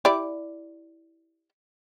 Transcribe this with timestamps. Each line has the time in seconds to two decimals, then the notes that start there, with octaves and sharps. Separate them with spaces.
0.05 E4 G4 D5